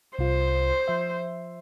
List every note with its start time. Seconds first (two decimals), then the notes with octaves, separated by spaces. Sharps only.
0.18 C2 F4 C5
0.88 F3 E5